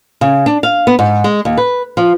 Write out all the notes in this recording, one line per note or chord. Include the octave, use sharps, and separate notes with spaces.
C#3
D4
F5
B3
G#2
G#3
D#2
B4
F3